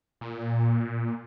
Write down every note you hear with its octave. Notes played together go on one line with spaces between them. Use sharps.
A#2